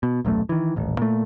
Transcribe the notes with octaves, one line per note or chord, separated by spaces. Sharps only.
B2
D#1 B1 F#2 A3
D#3 E3
D#1 A1
A#2 A3